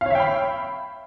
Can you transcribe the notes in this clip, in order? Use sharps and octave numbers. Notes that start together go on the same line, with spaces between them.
C#5 E5 F5 G5 B5